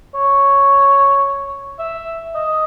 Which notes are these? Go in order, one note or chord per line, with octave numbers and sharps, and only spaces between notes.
C#5
E5
D#5